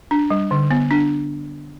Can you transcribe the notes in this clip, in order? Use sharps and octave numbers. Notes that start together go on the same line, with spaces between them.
D4
G3
D3
B3
D4